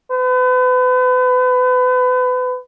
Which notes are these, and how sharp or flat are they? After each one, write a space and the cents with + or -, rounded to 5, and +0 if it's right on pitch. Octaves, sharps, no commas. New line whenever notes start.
B4 +35